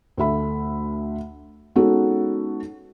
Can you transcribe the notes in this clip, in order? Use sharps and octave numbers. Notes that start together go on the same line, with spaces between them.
D2 A4 E5 B5
G#3 B3 C#4 D#4 F#4 A4